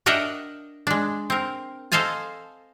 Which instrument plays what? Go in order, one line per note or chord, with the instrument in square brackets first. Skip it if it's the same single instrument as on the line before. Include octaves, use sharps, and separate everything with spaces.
[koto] D4 A#4 D#5 E5 F#5 G5
G#3 D4
C4 A#4
A4 C5 D#5 F5 G#5 A5